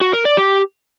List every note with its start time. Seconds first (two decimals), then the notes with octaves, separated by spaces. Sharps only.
0.01 F#4
0.13 A#4
0.25 D5
0.37 G4